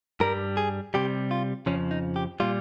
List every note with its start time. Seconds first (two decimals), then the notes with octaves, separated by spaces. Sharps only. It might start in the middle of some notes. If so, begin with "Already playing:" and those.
0.20 G2 G3 A#4
0.57 G#4
0.94 C3 G3 G4
1.31 F4
1.66 F2 C#3 F3 C#4
1.91 D#4
2.16 G4
2.40 A#2 G3 F4